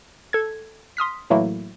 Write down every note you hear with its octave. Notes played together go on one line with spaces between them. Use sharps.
A4 G#6
C6 D#6 F6 B6
A2 E3 F#3 A3 A#3 E4